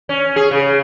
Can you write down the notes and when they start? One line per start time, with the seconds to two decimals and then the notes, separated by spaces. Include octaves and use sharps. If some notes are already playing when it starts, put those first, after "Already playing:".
0.09 C#4
0.36 G#4
0.51 C#3